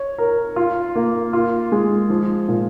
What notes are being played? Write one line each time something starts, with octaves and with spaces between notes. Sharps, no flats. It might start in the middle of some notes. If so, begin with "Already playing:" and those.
Already playing: C#5
A#4
F4
A#3
F4
G#3
F3
A#2